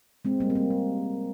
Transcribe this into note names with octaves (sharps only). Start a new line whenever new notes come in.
G#3 C4
G3 A#3
C4
G3 A#3
G3